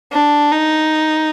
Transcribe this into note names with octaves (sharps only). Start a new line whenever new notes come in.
D4
D#4